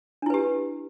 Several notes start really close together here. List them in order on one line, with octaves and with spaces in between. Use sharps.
D4 E4 B4 G4